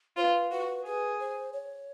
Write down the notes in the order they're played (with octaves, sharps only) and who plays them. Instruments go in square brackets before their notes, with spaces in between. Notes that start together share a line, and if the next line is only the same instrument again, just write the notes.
[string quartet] F4 [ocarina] B4 C5
[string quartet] F#4 [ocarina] B4
[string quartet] G#4 [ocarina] B4
[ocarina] C5
C#5